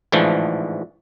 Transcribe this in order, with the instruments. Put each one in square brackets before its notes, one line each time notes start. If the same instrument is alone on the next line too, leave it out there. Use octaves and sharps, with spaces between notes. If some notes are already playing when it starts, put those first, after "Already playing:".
[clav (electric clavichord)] A1 G#2 D3 E3 F3 A3